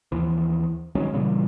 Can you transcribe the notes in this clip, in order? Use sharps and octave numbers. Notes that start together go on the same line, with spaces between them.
D#2 E3 F3
D#3 F#3 G#3 C#4
A#2 C#3 E3 G3